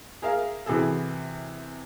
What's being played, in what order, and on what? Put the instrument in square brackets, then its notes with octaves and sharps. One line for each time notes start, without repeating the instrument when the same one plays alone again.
[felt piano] G#4 A#4 E5 F5
C3 E3 E4 F#4 G#4 A4